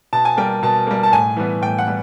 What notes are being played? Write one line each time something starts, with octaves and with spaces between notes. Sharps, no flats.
B2 A5
G#5
G3 A#3 G5
B2 A5
G3 A#3
A5
A2 G#5
E3 G3 B3
A2 G5
F#5
G3 B3